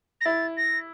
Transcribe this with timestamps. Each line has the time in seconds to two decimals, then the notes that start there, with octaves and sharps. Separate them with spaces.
0.20 A#6
0.25 E4 A6
0.56 A#6